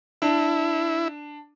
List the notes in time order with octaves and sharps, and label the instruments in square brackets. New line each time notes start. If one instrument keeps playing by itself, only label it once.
[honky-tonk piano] D4 [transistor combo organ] E4